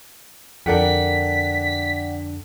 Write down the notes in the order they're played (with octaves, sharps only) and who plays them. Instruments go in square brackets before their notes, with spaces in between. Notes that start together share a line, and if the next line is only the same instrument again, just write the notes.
[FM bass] F2 [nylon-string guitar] D3 A4 A#4 [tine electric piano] D5 F#5 G5 [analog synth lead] B6